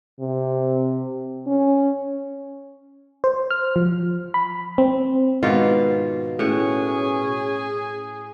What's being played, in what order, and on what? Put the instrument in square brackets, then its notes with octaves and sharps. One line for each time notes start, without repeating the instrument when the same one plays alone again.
[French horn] C3
C#4
[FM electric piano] C5
F6
F3
B5
C4
[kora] G#2 D#3 [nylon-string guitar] B2 F4
[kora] A2 F#5 [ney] C#4 [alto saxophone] G#4